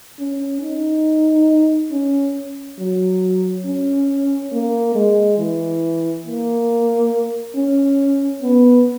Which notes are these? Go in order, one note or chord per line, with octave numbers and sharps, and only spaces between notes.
C#4
D#4
C#4
F#3
C#4
A#3
G#3
E3
A#3
C#4
B3